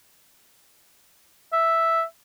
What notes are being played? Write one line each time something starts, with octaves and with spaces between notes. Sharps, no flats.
E5